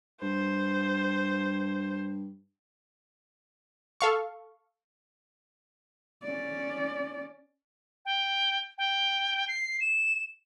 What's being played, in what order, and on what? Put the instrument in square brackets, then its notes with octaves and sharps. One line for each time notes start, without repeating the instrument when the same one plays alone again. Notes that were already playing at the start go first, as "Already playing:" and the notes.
[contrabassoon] G2 [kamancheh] C5
[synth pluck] A4 F5 C#6
[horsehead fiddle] C#4 D5
[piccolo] G5
G5
C7
E7